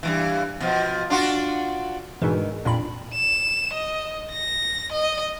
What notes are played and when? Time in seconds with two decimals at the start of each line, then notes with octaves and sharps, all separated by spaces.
0.03 G2 A#2 E3
0.60 B2 F3
1.10 D4 F4 F#4
2.22 G#2 B2 D#3 E3 G#3 D4
2.65 F2 A#2 D4 B5
3.13 E7
3.73 D#5
4.31 A#6
4.92 D#5